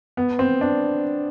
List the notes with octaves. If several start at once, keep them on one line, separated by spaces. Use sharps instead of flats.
B3
C4
D4